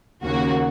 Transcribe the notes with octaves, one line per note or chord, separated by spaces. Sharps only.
D#2 C#3 A#3 F#4